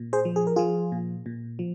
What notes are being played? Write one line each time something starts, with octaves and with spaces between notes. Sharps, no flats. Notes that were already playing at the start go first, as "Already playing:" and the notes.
Already playing: A#2
G#4 C5
F3
G#4
A#4
F3 F4 G#4
A#2
A#2
F3